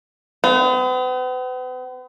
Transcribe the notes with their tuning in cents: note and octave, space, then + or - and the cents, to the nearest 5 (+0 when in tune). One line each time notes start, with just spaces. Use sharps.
B3 +45